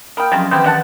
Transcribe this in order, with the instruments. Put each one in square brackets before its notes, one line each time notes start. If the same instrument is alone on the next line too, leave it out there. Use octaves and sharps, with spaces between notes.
[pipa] A#3 G5 [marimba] B5 D#6 F6
[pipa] C3 G#3 F4 [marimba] F3 F#3 C#4
[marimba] D#3 E3 B4 [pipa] B3 C4 G4
[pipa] C3 F#5 A5